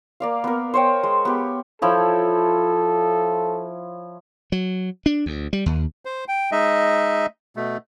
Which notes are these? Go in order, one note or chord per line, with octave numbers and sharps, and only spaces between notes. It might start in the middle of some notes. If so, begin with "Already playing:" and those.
A#3 D5 F5
B3 A#4
C5 C#5 G5
G#3
B3 G4
F3 E4 A4 C#5
F#3
D4
D2
G3
D#2
C5
G5
G#3 D#4 D#5 E5
B2 A3